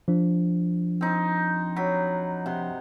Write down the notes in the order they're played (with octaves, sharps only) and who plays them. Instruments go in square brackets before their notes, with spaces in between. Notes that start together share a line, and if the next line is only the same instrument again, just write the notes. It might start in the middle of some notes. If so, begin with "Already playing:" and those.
[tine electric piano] F3 D4
[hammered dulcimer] C4 D#4
F#3 B5
C3 F#5 C6